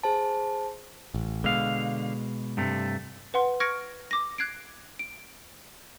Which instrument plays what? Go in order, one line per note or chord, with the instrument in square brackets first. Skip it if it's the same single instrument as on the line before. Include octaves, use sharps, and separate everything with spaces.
[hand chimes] G#4 C5 A5
[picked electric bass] A1
[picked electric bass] B2 G#3 [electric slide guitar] D3 F5
[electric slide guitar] G2 C3 A3
[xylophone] B4 F#5 C6
C#6 F6 G#6 A#6 C#7 D7
D6 A#6
F#6 G#6 C7 D7
D7